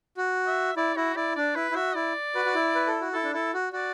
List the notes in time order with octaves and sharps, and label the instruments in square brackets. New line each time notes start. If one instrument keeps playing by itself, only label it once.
[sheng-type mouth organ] F#4
[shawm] E5
[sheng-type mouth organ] E4 [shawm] D5
[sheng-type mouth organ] E4 [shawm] F#4
[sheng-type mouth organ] E4 [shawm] D5
[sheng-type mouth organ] D4 [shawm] D5
[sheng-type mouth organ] E4 [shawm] B4
[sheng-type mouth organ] E4
[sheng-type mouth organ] F#4 [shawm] E5
[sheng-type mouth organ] E4 [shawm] D5
[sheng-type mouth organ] F#4 B4
F#4
E4
B4
A4
F#4
[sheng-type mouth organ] E4 [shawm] A4
[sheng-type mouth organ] D4
[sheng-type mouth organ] E4 [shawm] A4
[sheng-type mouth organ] F#4
[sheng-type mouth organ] F#4 [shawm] D5